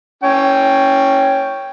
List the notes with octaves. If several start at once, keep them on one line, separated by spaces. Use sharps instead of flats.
C#4 G5